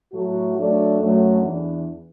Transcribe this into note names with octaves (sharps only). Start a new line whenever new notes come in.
A2 F#3 A3 F#4
F#3 A3 D4 A4 D5
F#2 F#3 A3 F#4
E2 E3 D4